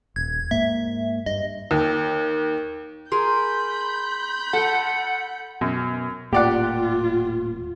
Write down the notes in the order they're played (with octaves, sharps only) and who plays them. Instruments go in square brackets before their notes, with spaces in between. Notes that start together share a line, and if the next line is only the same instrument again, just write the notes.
[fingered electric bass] D#1 [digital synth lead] G#6
[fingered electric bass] G#2 A#3 [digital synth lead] E5
[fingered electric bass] G2 [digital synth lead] D#5
[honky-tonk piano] D#2
[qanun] G#4 A#4 [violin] B5 G6 [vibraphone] C6
[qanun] A4 G5 [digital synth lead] F#5
[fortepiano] F#2 [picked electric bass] B2
[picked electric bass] D#1 A2 A#3 [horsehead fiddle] F4 [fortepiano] G4 D5 F#5